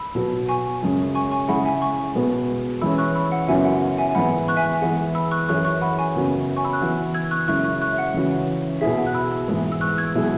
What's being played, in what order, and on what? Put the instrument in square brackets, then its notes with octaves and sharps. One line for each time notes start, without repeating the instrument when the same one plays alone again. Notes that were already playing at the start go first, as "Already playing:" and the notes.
Already playing: [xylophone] B5 E6
[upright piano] B2 F#3 B3
[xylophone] G#5 C#6
[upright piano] F#2 C#3 G#3 C#4
[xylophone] G#5 C#6
G#5 C#6
[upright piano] C#3 G#3 E4 G#4 [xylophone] F#5 B5
[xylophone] E5 G#5
G#5 C#6
[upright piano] B2 G#3 B3
[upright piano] E3 G#3 C#4 [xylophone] B5 E6
[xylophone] C#6 F#6
B5 E6
F#5
[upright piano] F#2 C#3 F#3 B3 E4 [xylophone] E5 G#5
[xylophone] F#5
F#5
E5 G#5
G#5
[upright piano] G#2 E3 G#3 B3 [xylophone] F#5 B5
[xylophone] C#6 F#6
E5 G#5
E5 G#5
[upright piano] E3 B3 G#4 [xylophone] F#5
[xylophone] B5 E6
C#6 F#6
[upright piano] F#2 E3 C#4 G#4 [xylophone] C#6 F#6
[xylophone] C#6 F#6
F#5 B5
G#5 C#6
[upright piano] F#2 C#3 F#3 B3
[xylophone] G#5 C#6
B5 E6
C#6 F#6
[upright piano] E3 B3 F#4
[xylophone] E6 G#6
C#6 F#6
[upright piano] F#2 C#3 G#3 E4 [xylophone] C#6 F#6
[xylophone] C#6 F#6
C#6 F#6
E5
F#5
[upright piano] C#3 E3 C#4 F#4
[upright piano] B2 B3 E4 G#4 [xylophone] E5
[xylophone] F#5
F#6
B5 E6
[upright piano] G#2 E3 G#3 B3
[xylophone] E6
C#6 F#6
E6 G#6
[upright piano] B2 F#3 E4 G#4